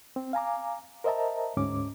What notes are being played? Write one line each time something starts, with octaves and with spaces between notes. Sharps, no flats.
C4
F5 G#5 A#5 D6
A#4 C5 D#5 E5 A5 A#5
D2 G#2 C#4 D6